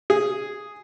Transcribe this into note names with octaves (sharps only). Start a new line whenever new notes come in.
G#4